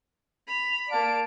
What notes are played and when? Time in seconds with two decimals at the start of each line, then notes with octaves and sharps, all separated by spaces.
0.47 B5 F7
0.90 A#3 D5 F5 A5 D7